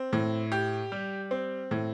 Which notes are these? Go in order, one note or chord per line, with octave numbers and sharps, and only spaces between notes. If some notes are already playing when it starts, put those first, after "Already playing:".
Already playing: C4
A2
G4
G3
C4
A2